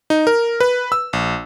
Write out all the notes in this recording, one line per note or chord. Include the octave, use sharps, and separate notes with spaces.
D#4
A#4
B4
E6
A#1